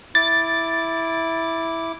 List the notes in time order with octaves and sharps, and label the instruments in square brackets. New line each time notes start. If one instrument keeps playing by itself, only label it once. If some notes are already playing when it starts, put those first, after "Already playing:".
[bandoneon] E4 D6 [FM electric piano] A6